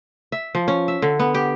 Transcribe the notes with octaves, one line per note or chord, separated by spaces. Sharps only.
E5
F3
C#4
E5
D3
B3
G4